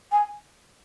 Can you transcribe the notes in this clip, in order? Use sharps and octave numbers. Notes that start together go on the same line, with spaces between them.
G#5